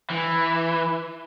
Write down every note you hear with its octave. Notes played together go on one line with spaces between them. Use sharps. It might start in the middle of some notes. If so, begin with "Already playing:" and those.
E3